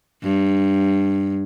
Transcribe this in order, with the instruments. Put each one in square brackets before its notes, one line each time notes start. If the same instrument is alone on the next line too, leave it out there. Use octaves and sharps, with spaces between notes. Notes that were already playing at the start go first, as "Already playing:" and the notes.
[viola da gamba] G2